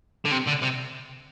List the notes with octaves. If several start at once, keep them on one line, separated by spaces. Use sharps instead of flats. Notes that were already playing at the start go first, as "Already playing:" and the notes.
D3
C3
D3
C3